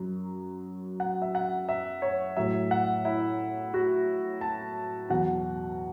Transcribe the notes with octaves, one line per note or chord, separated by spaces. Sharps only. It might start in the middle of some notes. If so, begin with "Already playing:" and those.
Already playing: F#2 F#3
F#5
E5
F#5
E5
C#5
A2 F#3 E5
F#5
E4
F#4
A5
E2 B2 F#3 F#5